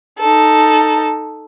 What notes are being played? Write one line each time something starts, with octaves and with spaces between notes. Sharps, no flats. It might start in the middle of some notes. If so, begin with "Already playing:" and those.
D#4 A4